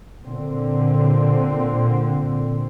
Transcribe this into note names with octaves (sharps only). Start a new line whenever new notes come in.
A#2 D3 C4